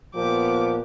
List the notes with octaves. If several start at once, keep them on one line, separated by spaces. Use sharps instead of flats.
A#2 F3 B3 G4 D6